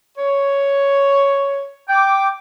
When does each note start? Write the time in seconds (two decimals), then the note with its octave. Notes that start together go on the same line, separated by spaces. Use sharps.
0.18 C#5
1.89 G5 D6